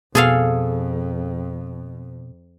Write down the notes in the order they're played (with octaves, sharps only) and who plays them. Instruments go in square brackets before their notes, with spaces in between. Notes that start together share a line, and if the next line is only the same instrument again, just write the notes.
[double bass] F2 [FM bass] B2 [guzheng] G#4 A4 F5